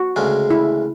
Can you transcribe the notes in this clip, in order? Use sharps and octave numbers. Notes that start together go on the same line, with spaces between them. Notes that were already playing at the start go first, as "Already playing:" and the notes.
Already playing: F#4
D2 C#3 G#3
E4